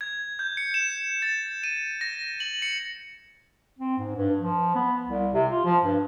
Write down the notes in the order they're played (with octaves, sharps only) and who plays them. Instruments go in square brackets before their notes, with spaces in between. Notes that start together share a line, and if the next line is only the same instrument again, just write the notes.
[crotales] G#6
G6
C#7
E7
A6
D#7
A#6
F#7
C#7
[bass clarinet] C4
G#2
G2
F3
B3
C2
C3
F4
F3
G2